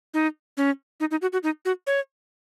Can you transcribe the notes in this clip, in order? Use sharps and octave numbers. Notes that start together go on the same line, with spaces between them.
D#4
C#4
D#4
D#4
F#4
F#4
D#4
F#4
C#5